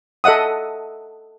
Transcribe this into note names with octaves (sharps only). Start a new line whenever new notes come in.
A4 D#5 E5 F#5 D#6